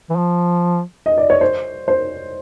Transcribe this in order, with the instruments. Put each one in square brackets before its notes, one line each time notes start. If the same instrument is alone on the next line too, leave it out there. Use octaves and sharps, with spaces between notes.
[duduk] E3
F3
[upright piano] D#5
D5
C#5
C5
C5